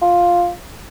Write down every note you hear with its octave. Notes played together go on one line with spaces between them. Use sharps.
F4